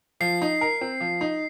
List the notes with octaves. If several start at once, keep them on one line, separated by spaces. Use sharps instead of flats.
F3 C7
D#4
A#4
C4
F3
D#4